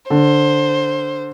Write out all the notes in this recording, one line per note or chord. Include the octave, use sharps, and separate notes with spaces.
D3 C5